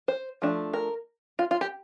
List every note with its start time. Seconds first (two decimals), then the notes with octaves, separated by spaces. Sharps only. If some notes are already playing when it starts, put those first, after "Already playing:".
0.08 C5
0.42 F3 A3 D4
0.74 A#4
1.39 F4
1.51 F4
1.61 G4